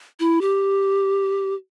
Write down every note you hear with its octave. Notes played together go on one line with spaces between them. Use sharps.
E4
G4